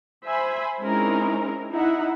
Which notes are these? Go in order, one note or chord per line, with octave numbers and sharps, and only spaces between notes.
C5 E5 G#5 B5
G#3 C4 C#4 D#4 E4 A#4
D#4 E4 E5 F#5